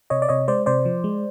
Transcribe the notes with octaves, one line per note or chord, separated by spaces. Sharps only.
C3 C#5 D#5
D5
C3 C#5 D#5
G#3 C5 D5
C3 C5 D5
F3
G#3